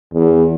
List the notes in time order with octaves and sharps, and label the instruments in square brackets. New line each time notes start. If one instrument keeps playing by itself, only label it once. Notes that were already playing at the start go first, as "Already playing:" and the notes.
[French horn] E2